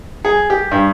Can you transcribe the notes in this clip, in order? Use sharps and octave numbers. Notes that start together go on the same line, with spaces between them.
G#4
G4
G2